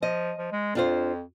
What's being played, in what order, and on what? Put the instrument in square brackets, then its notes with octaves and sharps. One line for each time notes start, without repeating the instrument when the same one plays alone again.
[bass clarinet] F3 [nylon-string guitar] D#5
[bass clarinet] F3
G#3
[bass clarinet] F2 [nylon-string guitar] D4 F4 C5